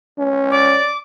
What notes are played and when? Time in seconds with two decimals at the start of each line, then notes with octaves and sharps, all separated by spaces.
0.18 C#4
0.51 D5 D6